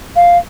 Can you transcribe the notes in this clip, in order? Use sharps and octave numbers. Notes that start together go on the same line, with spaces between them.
F5